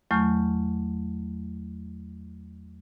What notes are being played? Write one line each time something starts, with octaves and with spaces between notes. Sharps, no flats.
E2 F#3 A3 C#6 F6 G6